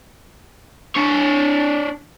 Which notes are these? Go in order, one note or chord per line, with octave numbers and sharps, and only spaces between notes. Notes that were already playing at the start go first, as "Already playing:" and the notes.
D4 C#5